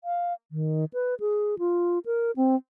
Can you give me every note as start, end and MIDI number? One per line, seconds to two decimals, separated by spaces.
0.04 0.34 77
0.52 0.85 51
0.93 1.15 71
1.20 1.59 68
1.59 1.99 65
2.06 2.31 70
2.36 2.55 60